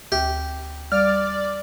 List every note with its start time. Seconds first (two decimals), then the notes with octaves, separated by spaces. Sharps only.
0.12 D2 G4
0.92 G3 D5 F6